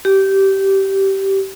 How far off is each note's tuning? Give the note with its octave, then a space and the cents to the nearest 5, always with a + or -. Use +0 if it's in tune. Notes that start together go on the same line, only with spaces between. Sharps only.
G4 -15